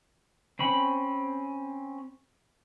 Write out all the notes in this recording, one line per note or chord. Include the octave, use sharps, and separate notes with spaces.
C4 C#4 B5